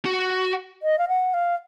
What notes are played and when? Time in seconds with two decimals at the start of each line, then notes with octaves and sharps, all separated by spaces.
0.05 F#4
0.83 D#5
0.98 F5
1.08 F#5
1.34 F5